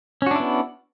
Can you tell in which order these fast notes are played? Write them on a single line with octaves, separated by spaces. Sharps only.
C#4 F#4 D4 E4 B3